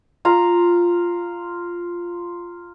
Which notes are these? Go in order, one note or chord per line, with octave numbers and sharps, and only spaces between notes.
F4 A#5